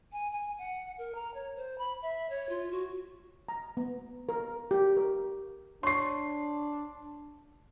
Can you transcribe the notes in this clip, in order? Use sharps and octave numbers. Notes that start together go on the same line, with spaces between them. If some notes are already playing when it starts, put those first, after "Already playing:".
G#5
G#5
F#5
A#4
A#5
C#5
C5
B5
E5
C#5
F4
F#4
A#5
B3
A#4
G4
A#4
D4 C#5 C6 C#6 C7